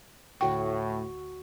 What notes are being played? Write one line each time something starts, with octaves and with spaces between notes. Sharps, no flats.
D2 A2 F#4 G5 C#6